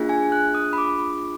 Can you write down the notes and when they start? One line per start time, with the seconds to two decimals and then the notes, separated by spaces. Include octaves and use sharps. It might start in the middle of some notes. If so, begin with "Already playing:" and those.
Already playing: A#3 D4 F4 G#4
0.09 G#5
0.32 F#6
0.55 D#6
0.73 B5
0.78 D6